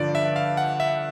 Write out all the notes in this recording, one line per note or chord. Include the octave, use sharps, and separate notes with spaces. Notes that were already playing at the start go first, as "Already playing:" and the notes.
Already playing: G2 D3 F3 D5
E5
F5
F#5
E5